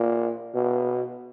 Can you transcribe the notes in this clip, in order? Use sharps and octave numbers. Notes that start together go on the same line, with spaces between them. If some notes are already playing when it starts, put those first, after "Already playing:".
Already playing: A#2
B2